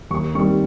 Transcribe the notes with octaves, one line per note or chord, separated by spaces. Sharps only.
D#2 C#6
D#3 G3 C4 C#6